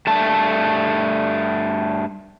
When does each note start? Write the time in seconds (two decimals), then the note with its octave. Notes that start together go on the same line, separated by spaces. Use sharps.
0.07 G2 A3 A5